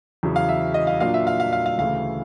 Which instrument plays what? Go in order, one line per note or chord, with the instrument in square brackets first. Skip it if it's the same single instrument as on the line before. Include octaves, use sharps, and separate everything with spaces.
[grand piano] E2 C#3 F#3
[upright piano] F5
E5
D#5
F5
[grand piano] A#2 F#3 A#3 D4 F4 [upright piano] F5
[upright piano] E5
F5
F5
F5
F5
[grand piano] D2 C#3 E3 A3 [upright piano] F5